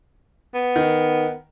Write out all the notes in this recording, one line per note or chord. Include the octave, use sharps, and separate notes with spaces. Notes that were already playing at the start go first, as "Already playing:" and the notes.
B3
D#3